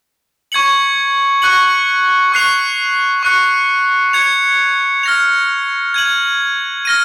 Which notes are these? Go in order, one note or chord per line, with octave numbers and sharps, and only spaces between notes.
C#6 G#6 C#7 F#7
C#6 F#6 C#7 F#7
C#6 F#6 C7 F7
C#6 F#6 C#7
G#6 C#7 F7
F6 A#6 F7
G#6 D#7 F#7
F6 A#6 D#7